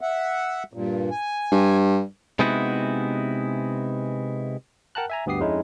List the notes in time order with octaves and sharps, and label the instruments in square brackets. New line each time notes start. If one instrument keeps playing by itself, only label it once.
[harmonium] E5 F#5
G2 A#2
G#5
[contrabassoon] G2
[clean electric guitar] C3 G#3 B3 D#4 E4 F#4
[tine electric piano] A#4 F#5 G5 A5 A#5 F#6
E5 G#5 A#5
D2 G2 B3 G4 D#6 C7
F2 G#3 C#4 D#4 E4